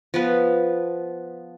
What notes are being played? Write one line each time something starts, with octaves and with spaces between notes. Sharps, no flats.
F3 B3 B4